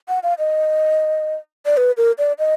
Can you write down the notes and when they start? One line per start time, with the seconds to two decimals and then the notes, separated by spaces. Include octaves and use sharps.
0.08 F#5
0.23 F5
0.39 D#5
1.66 D5
1.77 B4
1.97 A#4
2.18 D5
2.39 D#5